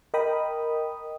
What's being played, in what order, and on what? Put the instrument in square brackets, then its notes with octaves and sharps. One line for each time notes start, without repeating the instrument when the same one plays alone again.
[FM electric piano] A#4 D#5 G5 B5 D#6